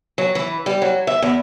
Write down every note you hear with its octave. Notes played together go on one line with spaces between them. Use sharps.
F#3
E3
G3
F#3
E5
E2